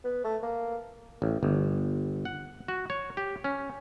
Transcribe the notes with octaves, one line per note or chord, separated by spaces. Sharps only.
B3
A3
A#3
A1
G1
F#5
F#4
C#5
G4
C#4